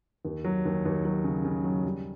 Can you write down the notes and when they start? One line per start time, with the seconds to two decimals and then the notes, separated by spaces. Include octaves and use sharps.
0.25 D#2
0.44 F#3
0.65 D#2
0.85 D#2
1.05 F#3
1.24 C#3
1.45 C#3
1.64 F#3
1.84 G3